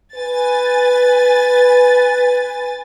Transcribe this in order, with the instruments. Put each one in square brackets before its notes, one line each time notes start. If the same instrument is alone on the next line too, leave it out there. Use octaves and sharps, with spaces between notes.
[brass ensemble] B4 [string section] G#5 A6